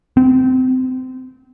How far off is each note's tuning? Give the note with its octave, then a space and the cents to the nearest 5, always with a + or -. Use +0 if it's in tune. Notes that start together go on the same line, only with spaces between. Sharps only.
C4 -25